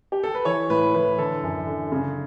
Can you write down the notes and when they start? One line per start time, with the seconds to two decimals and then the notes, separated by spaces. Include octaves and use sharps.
0.12 G4
0.24 A4
0.35 B4
0.45 E3 C#5
0.70 A2 B4
0.95 E3 B4
1.18 D3 A4
1.43 F#2
1.67 D3
1.92 C#3